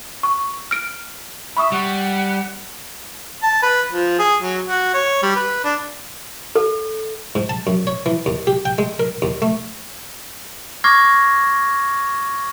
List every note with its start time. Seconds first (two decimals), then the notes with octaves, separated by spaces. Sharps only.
0.23 C#6
0.71 F6 D7
1.57 E5 B5 C#6 D#6
1.72 G3 F#5
3.43 A5
3.63 B4
3.92 F3
4.19 G#4
4.42 F#3
4.68 F#4
4.94 C#5
5.23 G3
5.36 B4
5.64 D4
6.55 A4
7.35 G#2
7.49 A5
7.67 F#2
7.87 C#5
8.06 E3
8.26 D#2
8.47 G4
8.65 G5
8.78 G#3
9.00 A#4
9.22 D#2
9.42 A3
10.84 C#6 D6 F6 G#6 A#6 C7